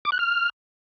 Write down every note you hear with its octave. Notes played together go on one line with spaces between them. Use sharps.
D6
F#6
F6